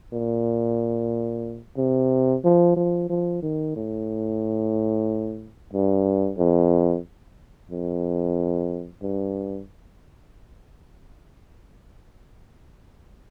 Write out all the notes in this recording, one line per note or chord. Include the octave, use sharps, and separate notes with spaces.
A#2
C3
F3
F3
F3
D#3
A2
G2
F2
F2
G2